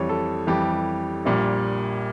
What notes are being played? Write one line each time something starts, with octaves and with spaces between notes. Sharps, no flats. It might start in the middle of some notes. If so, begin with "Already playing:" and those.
Already playing: F2 E3 G3 C#5
A4
F2 E3 G3 G4
A#1 A#2 G3